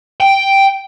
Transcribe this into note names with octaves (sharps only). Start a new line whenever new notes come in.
G5